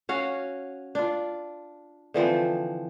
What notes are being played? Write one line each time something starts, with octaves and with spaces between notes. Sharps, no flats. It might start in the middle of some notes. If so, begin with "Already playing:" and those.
C#4 F#4 F5
D4 F4
D3 E3 F3 C4